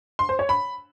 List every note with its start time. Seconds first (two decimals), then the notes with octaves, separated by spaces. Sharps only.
0.19 C6
0.29 C5
0.39 C#5
0.49 B5